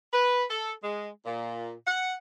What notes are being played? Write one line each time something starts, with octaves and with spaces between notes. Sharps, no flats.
B4
A4
G#3
A#2
F#5